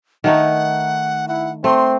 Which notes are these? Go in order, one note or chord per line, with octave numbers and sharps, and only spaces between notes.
D#3 A3 D#4 F#5
E4 F#5
A3 C4 C6